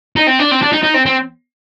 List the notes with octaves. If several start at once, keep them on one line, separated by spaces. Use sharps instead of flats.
D#4
C4
D4
C4
D4
D#4
D#4
C4
C4